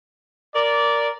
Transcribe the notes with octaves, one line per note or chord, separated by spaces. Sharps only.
A#4 D5